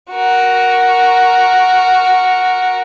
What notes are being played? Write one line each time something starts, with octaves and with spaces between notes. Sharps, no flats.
F#4 A#4